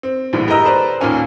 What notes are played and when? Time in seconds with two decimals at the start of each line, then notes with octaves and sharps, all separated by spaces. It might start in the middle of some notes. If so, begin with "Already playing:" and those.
0.03 C4
0.33 A#1 A2 D3 E3 G3
0.48 G4 A#4 B4 D#5 A#5 E6
0.65 A4 B4 C5 D5 A#5
1.01 D#2 A#2 D#3 A#3 C#4 G#5